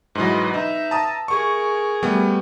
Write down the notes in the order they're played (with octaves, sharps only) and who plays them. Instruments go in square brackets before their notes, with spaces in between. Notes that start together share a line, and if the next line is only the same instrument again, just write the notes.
[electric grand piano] G#2 E3 F#3 [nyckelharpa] B4 D#5
[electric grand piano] D#4 [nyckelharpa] E5
[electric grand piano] A5 A#5 D#6
[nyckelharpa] G#4 A#4 [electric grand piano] C#6
[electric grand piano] G3 A3 B3